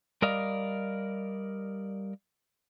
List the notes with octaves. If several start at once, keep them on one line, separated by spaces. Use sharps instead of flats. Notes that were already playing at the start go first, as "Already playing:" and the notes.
G3 A#4 D5 D#5 F5